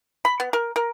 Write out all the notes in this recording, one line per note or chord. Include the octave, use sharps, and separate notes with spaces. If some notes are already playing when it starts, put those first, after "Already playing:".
B5
B3
A#4
A#4